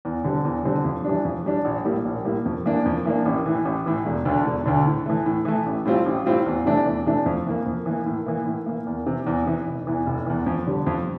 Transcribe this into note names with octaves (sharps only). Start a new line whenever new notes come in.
E2
D3 G3 C4
E2
D3 G3 C4
F2
E3 G3 D4
F2
E3 G3 D4
A#1
A2 G3 A#3
A#1
A2 G3 A#3
F2
E3 A#3 D4
F2
E3 A#3 D4
A1
A2 E3
A1
A2 E3
E1
D2 D3
E1
D2 D3
A2
E3 A3
A2
E3 A3
A1
A2 G3 C4 F4
A1
A2 G3 C4 F4
E2
C3 E3 A3 D4
E2
C3 E3 A3 D4
F2
E3 A#3
F2
E3 A#3
A2
E3 A#3
A2
E3 A#3
E2
C3 E3
E2
C3 E3
F1
E2 E3
F1
E2 E3
F2
D3 G3
F2